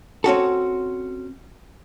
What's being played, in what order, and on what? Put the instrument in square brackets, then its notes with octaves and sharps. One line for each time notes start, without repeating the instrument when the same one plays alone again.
[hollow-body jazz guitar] C4 C#4 F#4 A4